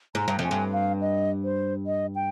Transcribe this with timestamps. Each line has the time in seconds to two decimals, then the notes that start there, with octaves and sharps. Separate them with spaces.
0.15 G#2 A#5
0.28 G2
0.39 F2
0.44 G#5
0.51 G2
0.73 F5
1.01 D#5
1.44 C5
1.86 D#5
2.15 G5